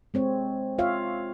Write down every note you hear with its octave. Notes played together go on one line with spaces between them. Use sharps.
G#3 C4 C#5
F4 C#5 E5 F5